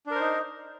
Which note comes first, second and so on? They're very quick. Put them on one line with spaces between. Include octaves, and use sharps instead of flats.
D4 A#4 C5 D#4